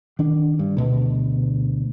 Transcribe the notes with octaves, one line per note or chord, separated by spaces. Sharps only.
D#3 D4
G2
D2 B2